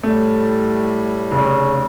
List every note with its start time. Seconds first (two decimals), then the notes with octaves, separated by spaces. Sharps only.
0.03 A2 G3 A3
1.32 F1 C#3